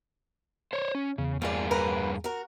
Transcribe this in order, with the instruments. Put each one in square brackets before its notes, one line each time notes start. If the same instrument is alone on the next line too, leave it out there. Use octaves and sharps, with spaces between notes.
[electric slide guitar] C5 C#5
C#4
[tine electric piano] E2 [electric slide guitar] C#3
[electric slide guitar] G2 A#3 G#4 [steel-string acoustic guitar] F4 D5
[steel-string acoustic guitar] A#4 B4 F#5
F#4 A#4